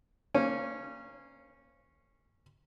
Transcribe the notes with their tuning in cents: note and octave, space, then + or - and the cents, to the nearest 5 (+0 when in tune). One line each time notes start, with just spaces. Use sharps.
A#3 -15 C#4 -15 C5 -30